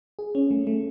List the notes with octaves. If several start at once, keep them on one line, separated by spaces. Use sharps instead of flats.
G#4
C#4
A3
A3